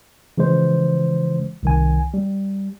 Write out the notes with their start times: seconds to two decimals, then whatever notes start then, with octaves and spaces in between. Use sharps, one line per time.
0.38 C#3 E3 F3 G#3 C5
1.63 C2 D#3 G#5
2.14 G3